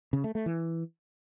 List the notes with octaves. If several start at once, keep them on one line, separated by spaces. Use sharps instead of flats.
C#3
A3
A3
E3